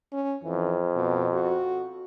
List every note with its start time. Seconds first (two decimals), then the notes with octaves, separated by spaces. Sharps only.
0.13 C#4
0.44 F2 E3
0.96 B2
1.34 F#4